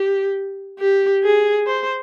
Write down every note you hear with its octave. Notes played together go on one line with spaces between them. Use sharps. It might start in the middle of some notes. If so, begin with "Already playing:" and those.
Already playing: G4
G4
G#4
C5